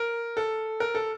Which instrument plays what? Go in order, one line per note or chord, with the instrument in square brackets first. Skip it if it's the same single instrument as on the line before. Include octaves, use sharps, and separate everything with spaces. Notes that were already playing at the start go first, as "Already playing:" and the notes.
Already playing: [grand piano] A#4
A4
A#4
A4